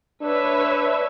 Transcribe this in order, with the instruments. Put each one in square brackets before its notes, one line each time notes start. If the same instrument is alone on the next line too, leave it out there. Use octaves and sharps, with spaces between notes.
[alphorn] D4 [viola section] B4 C#5 E5